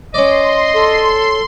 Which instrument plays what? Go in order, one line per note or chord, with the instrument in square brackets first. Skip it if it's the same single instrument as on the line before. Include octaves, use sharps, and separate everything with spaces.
[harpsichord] C#4 D5 [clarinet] D#5 [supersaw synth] C6
[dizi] A4